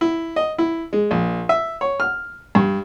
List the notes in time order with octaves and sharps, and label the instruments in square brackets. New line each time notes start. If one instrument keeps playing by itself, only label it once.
[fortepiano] E4
D#5
E4
G#3
A#1
E5
C#5
F6
G2